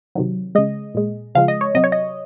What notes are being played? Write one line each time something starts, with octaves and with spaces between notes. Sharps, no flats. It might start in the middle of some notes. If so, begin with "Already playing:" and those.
C3 D#3 F#3
C#3 G#3 D#5
A#2 G#3
C#3 F3 G#3 F5
D#5
C#5
C3 F#3 D#5
C#5
D#5